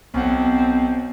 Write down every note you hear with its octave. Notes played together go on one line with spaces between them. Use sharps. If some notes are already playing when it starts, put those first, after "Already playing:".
B1 C4 F#5